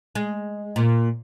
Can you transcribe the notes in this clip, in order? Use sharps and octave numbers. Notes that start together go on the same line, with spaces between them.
G#3
A#2